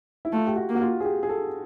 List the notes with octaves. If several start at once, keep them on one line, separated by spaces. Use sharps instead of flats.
E4
A3 F4
G4
F#4
A#3
F#4
F4
G#4
G4
G#4
A4